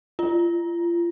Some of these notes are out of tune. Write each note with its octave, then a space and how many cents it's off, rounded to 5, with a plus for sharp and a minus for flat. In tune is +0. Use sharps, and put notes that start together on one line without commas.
F4 -35